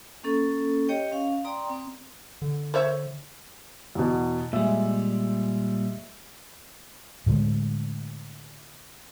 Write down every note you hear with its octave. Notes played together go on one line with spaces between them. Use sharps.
A#3 C#4 A4
G4 C#5 D#5 G5
C#4 F5
D5 G5 A#5 C6 D#6
C4
D3
C5 C#5 E5
E2 B2
A#2 G3 G#3 E5
A2 D3 G#3